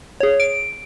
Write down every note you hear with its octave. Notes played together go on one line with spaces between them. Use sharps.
G#4 C#5
D7